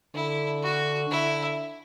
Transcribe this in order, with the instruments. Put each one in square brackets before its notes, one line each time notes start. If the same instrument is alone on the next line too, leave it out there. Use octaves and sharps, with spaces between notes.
[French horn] D3 [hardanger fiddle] E4
[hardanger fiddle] F#4
[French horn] D3 [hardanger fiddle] E4